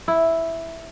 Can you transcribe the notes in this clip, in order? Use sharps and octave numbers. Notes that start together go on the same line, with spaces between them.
E4